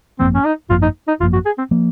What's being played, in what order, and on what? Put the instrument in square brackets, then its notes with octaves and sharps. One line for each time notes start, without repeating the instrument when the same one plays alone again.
[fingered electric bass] G#1 F#2 F3 A#3 [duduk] C4
[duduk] C#4
D#4
[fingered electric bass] G#1 F#2 F3 A#3 [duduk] F4
[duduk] D#4
D#4
[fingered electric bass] G#1 F#2 F3 A#3 [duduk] F4
[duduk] F#4
G#4
C4
[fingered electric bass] F3 A#3